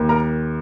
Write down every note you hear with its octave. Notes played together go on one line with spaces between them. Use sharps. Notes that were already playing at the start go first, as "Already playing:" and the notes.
Already playing: D#2
A#4 A#5